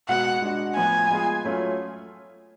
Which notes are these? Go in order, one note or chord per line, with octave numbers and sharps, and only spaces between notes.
B2 G#3 B3 F#4 F#5
G#3 D4 F#4
A2 F3 B3 F4 G#5
G#3 B3 F4 G#4
F#3 A3 C#4 F4